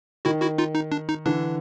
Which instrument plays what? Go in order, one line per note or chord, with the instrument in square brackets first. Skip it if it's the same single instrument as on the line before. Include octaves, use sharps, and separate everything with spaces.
[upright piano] D#3 [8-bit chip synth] E4 F#4
[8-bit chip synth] E4 F#4
D#4 F4
D#4
D4
D#4
[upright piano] D3 E3 [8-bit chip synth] D4